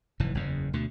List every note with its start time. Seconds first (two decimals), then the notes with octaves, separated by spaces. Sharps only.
0.20 F1 G#2 E3
0.35 F#1 E2 C#3
0.73 D2 B2 D3